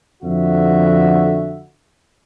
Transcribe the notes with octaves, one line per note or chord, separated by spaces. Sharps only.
F2 D3 F#4 E5